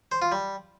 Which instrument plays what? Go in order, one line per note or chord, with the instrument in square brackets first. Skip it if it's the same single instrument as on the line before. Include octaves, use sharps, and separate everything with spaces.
[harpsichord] C5
F4
G3